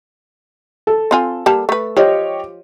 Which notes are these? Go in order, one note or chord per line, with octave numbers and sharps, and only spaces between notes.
A4
C4 F4 G#5
G3 A#3 A5
A3 B4
F3 G4 C#5 D#5